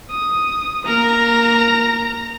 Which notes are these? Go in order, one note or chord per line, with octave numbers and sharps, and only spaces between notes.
D#6
A#3 A#4 A#5